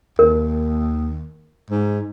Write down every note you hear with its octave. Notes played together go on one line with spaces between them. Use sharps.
D#2 A#4
G#2